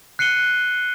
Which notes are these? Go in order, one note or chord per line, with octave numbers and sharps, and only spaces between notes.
F#6 C7 C#7 D#7 G7